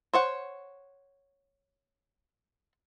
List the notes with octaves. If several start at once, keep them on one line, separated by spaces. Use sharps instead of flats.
C5 C#5 F#5